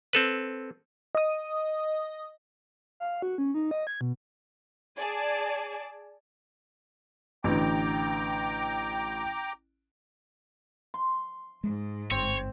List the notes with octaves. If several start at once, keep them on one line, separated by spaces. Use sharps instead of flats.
C4 A4 B4
D#5 D#6
F5
F#4
C#4
D#4
D#5
G#6
B2
G#4 D5 G#5 A5
A1 D3 G5 A#5 D6
C6
G#2 G#3
G1 C4 C#5